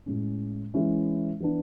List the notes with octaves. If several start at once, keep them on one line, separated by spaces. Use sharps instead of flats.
A2 G#3 C#4
E3 G#3 C#4 E4
E3 B3 D4